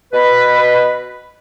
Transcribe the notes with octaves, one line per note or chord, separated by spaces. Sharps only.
B2 B4